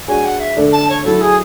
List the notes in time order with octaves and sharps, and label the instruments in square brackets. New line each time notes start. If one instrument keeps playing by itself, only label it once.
[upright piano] G#3 D4 F#4 C#5 [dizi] G#5
[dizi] F#5
E5
[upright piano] D3 A3 D4 A4
[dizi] A5
C#5
[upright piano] F#3 A3 E4 [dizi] A4
[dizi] G#4